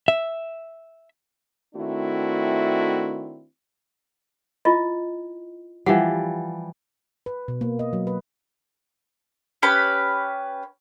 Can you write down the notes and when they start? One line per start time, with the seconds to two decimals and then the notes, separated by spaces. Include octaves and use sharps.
0.08 E5
1.75 D#3 A3 C4 D4 E4 F#4
4.65 E4 F4 D#5
5.86 E3 F3 G3 F#5
7.26 B4
7.48 B2
7.61 A#3
7.79 D#5
7.93 F#3
8.07 B4
9.63 C#4 G4 B4 B5